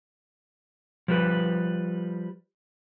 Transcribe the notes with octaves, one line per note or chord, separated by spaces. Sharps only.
F3 G3 B4